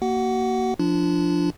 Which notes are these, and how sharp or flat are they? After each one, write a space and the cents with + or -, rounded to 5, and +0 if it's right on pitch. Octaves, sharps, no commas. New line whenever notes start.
A#3 +0 F#4 +35 F#5 +10
F3 +0 D4 +0 F4 -30